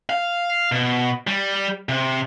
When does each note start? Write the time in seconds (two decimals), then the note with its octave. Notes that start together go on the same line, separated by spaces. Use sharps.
0.10 F5
0.72 B2
1.27 G3
1.89 C3